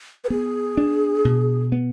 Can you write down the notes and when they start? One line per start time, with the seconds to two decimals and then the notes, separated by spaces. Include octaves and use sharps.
0.24 B4
0.30 B3 G#4
0.77 D4
1.25 B2
1.72 B3